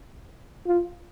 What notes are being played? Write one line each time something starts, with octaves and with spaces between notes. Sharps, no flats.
F4